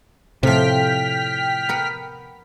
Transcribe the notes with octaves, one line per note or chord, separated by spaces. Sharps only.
A2 C3 F3 G5 F6 B6
B3 A#4 F#5